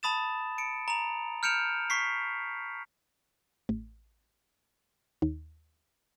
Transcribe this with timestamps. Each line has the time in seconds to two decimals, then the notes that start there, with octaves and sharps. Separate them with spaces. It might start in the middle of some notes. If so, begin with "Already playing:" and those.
0.03 A5 B5 D#6 A6 E7
0.58 C#7 D7
0.88 A#5 F7
1.43 F6 G6 C#7 D7 E7 F7
1.90 C#6 B6 C7
3.69 A1
5.22 D#2